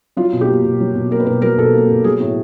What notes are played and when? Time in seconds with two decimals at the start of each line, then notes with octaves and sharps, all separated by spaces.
0.17 F#3 F4
0.33 B2
0.41 G4
0.48 A#3
0.64 B2
0.80 F#3
0.95 B2
1.11 A#3 A#4
1.20 B4
1.26 B2 A#4
1.42 F#3 A#4
1.57 B2 A4
1.74 A#3
1.89 B2
2.04 F#3 G#4
2.20 A2